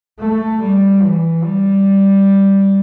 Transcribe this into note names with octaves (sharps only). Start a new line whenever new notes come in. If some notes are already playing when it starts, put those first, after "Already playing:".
A3
G3
E3
G3